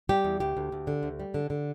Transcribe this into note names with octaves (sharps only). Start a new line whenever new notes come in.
G3 G4
E2
D2 G4
D2
D2
D3
D2
G3
D3
D3